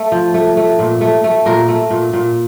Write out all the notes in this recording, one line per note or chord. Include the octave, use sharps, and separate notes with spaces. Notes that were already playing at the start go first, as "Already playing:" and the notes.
Already playing: A3 A4
F3
A3
A3
A#2
A3
A3
A#2 A#4
A3
A#2
A#2